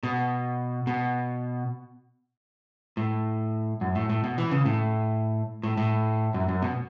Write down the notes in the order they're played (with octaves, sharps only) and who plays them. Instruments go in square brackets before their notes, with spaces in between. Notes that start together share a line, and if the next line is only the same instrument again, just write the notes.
[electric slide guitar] B2
B2
A2
F#2
A2
A2
B2
E3
C#3
A2
A2
A2
F#2
F#2
B2